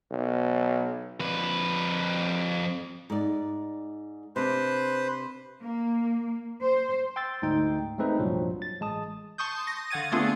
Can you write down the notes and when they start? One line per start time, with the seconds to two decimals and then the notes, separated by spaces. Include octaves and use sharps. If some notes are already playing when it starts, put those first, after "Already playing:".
0.10 B1
1.20 F2 B4
3.10 G#2 D5
4.36 C3 D4 B4 C5
5.62 A#3
6.62 C5
7.16 G5 C6 E6 A6
7.42 D2 G#2 D#4 G5
7.98 G#3 A3 C4 D#4 B4
8.18 C2 G2 A#2 F3 F#3
8.62 A6
8.80 A1 G#3 A5 D#6
9.38 A5 C6 C#6 D#6 G6
9.67 A#6
9.90 D3 F5 F#5 G#6 A6 D#7
10.12 A3 B3 C4 D4 F4 G#4